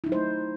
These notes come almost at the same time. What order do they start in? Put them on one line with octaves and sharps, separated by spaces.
E4 D#4 F#3 C5 A3